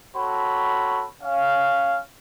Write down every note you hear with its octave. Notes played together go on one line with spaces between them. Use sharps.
C4 F#4 A4 C#5 B5
C#4 F5